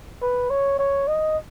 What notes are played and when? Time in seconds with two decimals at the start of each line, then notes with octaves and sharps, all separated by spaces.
0.22 B4
0.50 C#5
0.79 C#5
1.08 D#5